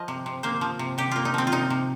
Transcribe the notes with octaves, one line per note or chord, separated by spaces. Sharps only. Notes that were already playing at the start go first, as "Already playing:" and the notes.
Already playing: F3 D#5
C3
C3
A#3 C5
F3
C3
C3 G4
A#3 F4
D#4
F3 C4
F4
C3 D#4
C3